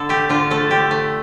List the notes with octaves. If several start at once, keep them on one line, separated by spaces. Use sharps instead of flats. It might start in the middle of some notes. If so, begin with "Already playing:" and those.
Already playing: D3 A4
A3 G4
D3 F4
A3 A4
D3 G4
A3